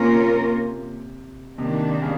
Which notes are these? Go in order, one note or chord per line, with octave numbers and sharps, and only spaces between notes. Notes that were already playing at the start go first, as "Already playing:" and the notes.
Already playing: C3 A#3 C#4 F4 A#4
C3 D#3 G3 A#3 D4
C#3